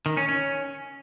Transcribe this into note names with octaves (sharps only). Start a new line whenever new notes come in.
D#3
C#4
C#4